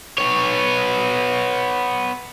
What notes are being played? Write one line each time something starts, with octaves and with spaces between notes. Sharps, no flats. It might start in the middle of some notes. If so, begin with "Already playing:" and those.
B3 C#5